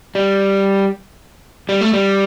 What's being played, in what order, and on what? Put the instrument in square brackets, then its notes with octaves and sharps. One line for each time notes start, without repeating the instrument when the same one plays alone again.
[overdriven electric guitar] G3
G3
A3
G3